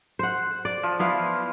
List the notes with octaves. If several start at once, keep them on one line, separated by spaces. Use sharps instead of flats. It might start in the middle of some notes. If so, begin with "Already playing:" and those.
C5 F#5
D5
F3
B3 E4 F5